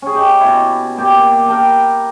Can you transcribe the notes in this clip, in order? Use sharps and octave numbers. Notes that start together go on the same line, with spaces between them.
C#4 G#4
D#4 G4
B2 E4
A#2 G4 D6
A#4 G5 A5